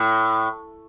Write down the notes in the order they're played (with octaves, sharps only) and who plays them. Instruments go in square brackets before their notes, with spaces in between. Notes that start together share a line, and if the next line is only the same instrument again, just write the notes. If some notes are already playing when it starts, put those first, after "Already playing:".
Already playing: [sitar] A2